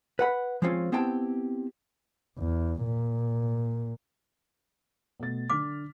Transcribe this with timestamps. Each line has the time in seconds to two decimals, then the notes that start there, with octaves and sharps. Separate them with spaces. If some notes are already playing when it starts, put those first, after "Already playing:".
0.19 B4 F#5 B5
0.62 F3 G#3 C4 C#4 F4
0.92 B3 C4 E4 G4 G5 A5
2.38 E2
2.83 A#2
5.20 B2 A3 A6
5.50 D3 D6 F6 B6